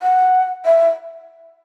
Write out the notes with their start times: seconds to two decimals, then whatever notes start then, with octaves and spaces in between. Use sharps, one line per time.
0.02 F#5
0.65 E5